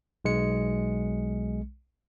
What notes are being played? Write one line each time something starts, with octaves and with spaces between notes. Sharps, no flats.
B1 G#3 C#7